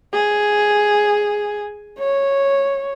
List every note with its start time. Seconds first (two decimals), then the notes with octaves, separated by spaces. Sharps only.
0.13 G#4
1.99 C#5